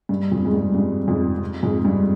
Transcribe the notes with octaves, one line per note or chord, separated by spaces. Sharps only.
G2
F2
G#2
G2
G2
F2 G#2
F2 G#2
G2